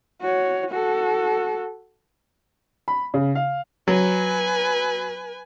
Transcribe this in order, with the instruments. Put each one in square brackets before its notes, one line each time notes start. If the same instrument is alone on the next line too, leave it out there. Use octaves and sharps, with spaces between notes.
[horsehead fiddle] F#4 C#5
F#4 A4
[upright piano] B5
C#3
F5
[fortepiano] F#3 [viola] B4 G#5